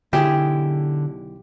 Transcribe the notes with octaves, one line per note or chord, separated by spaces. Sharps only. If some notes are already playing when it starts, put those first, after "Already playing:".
B1 D3 E4 G4 G#4